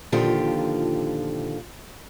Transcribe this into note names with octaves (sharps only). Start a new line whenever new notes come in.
A#2 D3 D#3 F3 F4 G4